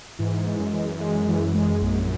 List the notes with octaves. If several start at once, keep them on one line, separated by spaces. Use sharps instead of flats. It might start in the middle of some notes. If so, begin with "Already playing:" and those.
G#2 E3
G#3
F#2
E3
G#3
E3
G#3
A#1